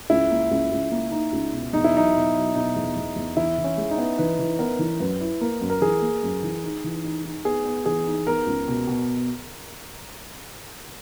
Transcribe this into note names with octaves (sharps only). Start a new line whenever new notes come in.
C#2 E4
A#3
C#2
C#2
A#3
D#4
C#2
B2
E2 D#4
E4
F#3 D#4
B2
F#3
B2 D#4
E2
E2
E2
E3 E4
E3
C#4
G#3
D#4
B3
E3 B4
E3
B3 A#4
E3
F#2 B4
E4
A#3 A#4
F#2
A#4
E3 G#4
A#3
F#2
E3
D#4
E3
D#4
D#4
B3 G#4
B3
E3 G#4
D#4
B3 A#4
C#2
B2
B2